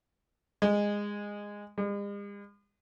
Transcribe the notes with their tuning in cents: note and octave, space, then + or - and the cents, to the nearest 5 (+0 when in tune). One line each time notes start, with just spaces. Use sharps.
G#3 -15
G#3 -45